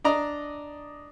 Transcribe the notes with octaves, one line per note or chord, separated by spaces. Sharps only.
D4 D5 D#5 A#5